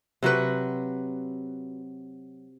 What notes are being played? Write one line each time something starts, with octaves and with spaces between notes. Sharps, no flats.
C3 F#3 F#4 B4